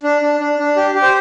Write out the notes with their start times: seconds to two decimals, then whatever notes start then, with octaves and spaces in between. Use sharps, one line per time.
0.03 D4
0.22 D4
0.40 D4
0.59 D4
0.76 G4
0.95 G4
1.03 C5